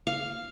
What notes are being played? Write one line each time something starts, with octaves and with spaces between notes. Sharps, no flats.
F5